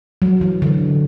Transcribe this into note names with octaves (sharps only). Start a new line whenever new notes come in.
F#3
E3
D3